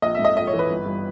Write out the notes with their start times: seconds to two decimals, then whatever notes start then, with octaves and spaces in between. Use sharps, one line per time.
0.02 A#1 D#5
0.15 G#2 E5
0.25 D#5
0.37 A#1 D#5
0.47 C#5
0.53 E3
0.59 B4
0.70 G1
0.86 G2